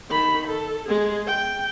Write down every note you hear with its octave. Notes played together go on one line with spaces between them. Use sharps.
D#3 B5
A4
G#3 G#4
G5